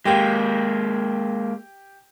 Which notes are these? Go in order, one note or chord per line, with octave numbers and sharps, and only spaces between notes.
G#3 A#3 G4 G5